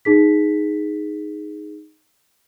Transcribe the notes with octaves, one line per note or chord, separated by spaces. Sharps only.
D#4 G#4 B6